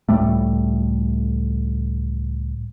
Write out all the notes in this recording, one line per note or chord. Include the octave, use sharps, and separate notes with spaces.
C#2 A2 G3 A3